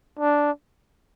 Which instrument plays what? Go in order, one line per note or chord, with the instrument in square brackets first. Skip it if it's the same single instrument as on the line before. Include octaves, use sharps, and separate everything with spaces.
[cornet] D4